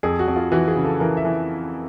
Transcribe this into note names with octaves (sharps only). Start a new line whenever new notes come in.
F2 G#4
F#4
F2
F4
E3 F#4
G#4
C#3
A4
E3 A#4
E5
E3